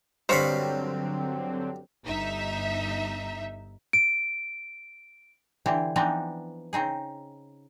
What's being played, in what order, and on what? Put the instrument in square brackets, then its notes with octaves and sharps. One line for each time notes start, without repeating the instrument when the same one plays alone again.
[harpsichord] G2 F5 B5 [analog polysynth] D3 F#3 C4 [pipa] C5 C#5
[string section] G1 D#4 E5
[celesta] D7
[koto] D3 E3 C4 E4 G4
E3 F3 B3 C4 D4 D#4
C#3 C4 D#4 G#4